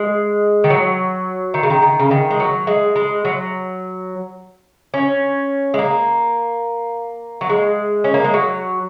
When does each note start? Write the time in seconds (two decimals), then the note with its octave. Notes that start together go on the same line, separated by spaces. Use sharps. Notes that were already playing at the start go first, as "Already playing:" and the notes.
Already playing: G#3
0.64 D#3
0.70 F#3
1.54 D#3
1.63 C#3
1.70 D#3
1.82 D#3
2.00 C#3
2.11 D#3
2.31 G#3
2.40 F#3
2.67 G#3
2.96 G#3
3.25 F#3
4.94 C#4
5.74 G#3
5.79 A#3
7.41 F#3
7.49 G#3
8.04 C#4
8.14 A#3
8.24 G#3
8.34 F#3